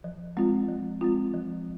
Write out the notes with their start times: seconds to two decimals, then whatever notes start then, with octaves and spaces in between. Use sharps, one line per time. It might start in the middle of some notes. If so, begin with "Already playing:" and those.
0.04 F3
0.37 G#3 C4 F4
0.68 F3
1.01 G#3 C4 F4
1.34 F3